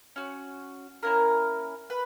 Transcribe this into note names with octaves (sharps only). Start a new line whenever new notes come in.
C#4 F#4
A#3 C#4 E4 A#4
B4